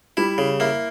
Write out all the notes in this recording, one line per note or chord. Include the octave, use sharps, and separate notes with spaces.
G3 E4
C#3
A#3 E4